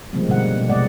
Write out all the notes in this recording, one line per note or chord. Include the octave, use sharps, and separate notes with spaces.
C#3 F3 G3 G#3 A#3 C4
B2 D3 G3 F#5
A3
B2 B3
C3 G#3 B3 D5 D#5 F#5